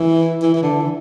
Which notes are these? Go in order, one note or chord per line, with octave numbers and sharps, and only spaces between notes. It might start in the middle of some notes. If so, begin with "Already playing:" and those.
Already playing: E3
E3
E3
D3
E3